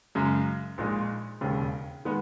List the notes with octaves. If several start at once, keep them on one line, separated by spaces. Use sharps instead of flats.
F#2 C#3 G#3
A#1 A#2 G#3 D#4
E1 D#2 C#3
D#3 G#3 B3